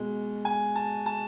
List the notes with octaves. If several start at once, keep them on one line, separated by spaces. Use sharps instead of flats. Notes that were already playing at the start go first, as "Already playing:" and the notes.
Already playing: B2 G#3
G#5
A5
A5